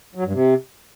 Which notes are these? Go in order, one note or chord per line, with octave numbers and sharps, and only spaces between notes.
F#3
G2
C3